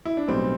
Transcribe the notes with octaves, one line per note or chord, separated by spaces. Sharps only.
E4
D4
B1 A2 G3 C4